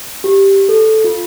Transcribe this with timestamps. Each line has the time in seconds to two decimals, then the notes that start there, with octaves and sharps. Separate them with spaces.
0.24 G4
0.69 A4
1.04 F4